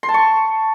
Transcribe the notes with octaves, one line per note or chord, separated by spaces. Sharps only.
C6
A5
C#6